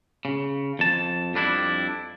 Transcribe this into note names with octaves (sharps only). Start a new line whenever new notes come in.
C#3
F2 A5
F2 G3 D4 E4